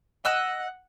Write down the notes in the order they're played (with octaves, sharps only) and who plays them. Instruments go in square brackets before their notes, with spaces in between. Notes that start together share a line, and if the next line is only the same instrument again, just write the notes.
[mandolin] D#5 E6 F#6 [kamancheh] F#5